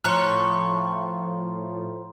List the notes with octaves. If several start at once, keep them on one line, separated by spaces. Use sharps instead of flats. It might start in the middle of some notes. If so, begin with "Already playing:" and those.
A2 F3 C#5 A#5 C6 C#6 F#6